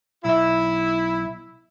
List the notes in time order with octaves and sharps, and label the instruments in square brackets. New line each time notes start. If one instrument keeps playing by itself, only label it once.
[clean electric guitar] B1 E5 [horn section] E4